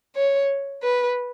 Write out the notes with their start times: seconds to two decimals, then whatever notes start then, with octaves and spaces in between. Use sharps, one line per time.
0.16 C#5
0.83 B4